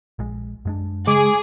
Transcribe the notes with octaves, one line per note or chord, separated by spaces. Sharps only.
A#1 G#3
F#2 G#3 D4
C#3 G#3 G#4 D6